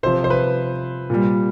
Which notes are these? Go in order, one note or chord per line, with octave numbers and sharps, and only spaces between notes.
C3 F3 C5
C5
B4
A#2 G3